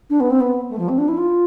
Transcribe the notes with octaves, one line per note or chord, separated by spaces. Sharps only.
D4
B3
C4
B3
A3
F3
C4
D4
E4
F4